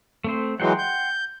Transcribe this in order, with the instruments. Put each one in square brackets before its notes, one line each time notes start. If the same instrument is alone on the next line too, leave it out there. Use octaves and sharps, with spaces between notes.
[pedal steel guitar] A3 C4 C5
[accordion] E3 F#3 G#3 [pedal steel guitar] F#5 G5 C6
[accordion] G6